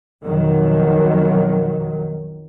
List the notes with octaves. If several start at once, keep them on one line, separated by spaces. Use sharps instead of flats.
B1 F2 D#3 F#3